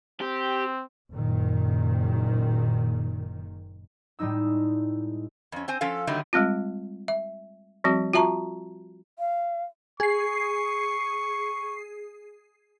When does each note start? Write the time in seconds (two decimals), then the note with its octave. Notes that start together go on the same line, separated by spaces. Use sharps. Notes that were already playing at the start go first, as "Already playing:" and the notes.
0.21 C4 G4
1.10 F#1 A#2 D#3
4.19 A2 G3 G#3 D#4 E6
5.52 F2 C#4
5.68 C4 C5 G#5
5.81 F3 C#4 A4 F5
6.07 D3 D#3 F#3 G3 A3 D#4
6.33 G3 G#3 C4 F4
7.08 E5
7.84 F3 G3 C4 F#4
8.13 F4 F#4 E5 A5 A#5 C#6
9.19 F5
10.00 G#4 C#6 C7